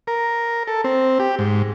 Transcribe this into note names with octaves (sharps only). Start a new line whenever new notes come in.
A#4
A4
C4
G4
G#2